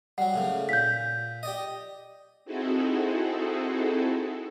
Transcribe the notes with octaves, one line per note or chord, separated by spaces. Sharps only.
F#3 G3 F#5
A2 C#3 A#3
A#2 G6 B6
G4 D5 D#5
C4 D#4 E4 F#4 G#4 A4